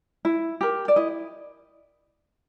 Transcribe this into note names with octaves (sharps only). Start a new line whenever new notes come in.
E4
G4 A#4
D5
E4 D#5